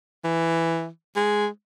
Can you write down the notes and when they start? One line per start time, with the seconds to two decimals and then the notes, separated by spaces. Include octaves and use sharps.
0.24 E3
1.16 G#3